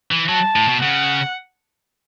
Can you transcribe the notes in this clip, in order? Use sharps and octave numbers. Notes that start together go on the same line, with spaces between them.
E3
F#3 A5
A2
B2
C#3 F#5